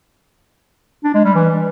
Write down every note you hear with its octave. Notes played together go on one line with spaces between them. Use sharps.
D4
G#3
G3
E3